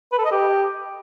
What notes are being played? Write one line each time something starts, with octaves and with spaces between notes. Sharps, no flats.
B4
A4
D#5
G4